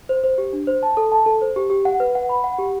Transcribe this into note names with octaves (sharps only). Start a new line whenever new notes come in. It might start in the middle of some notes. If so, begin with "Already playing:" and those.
C5
C5
G4
D4
C5
A5
A4
A5
A4
C5
G4
G4
F#5
B4
F#5
B5
F#5
G4